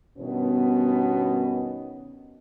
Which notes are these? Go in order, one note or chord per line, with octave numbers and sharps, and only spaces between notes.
G2 B2 D#3 B3 C#4